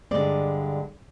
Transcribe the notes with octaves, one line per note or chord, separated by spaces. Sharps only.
G2 D3 G#3 C4 D5